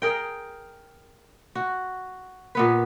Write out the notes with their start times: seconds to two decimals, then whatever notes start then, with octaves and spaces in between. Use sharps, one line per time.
0.02 G#4 A#4 G5
1.55 F#4
2.55 A#2 B3 B4